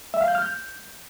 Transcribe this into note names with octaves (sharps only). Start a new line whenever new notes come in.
E5
F5
G6
F6
G6